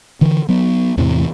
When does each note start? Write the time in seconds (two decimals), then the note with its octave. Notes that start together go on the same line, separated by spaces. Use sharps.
0.21 D3 E3
0.49 F#3 B3
0.98 E2 A2 C3 E3